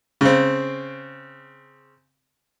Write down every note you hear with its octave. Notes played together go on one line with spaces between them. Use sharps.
C#3 C4